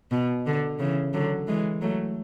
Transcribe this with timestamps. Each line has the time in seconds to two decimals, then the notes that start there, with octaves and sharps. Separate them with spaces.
0.11 B2
0.46 D3
0.79 C#3 E3
1.14 D3 F#3
1.47 E3 G#3
1.81 F#3 A3